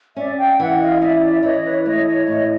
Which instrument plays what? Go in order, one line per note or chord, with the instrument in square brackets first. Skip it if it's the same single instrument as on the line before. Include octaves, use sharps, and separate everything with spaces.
[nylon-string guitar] C#4 [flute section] D5 E5
[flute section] F5 G5
[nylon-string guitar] E3 [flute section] E5 F#5
[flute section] D#5 F5
D#5
[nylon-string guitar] C#4 [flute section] D5 E5
[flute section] D5 E5
[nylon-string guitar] E3 [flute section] C#5 D#5
[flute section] B4 C#5
[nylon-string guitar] A3 [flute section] C#5 D#5
[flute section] C#5 D#5
[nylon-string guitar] A2 [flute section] C#5 D#5